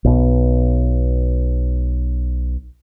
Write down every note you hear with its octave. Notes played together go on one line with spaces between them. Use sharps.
B1 B2